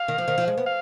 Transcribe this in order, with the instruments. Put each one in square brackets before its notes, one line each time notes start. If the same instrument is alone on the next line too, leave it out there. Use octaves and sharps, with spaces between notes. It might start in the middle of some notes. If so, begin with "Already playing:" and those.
Already playing: [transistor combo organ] F5
[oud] D#3
F3
D#3
F3
G#3
B3
[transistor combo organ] F5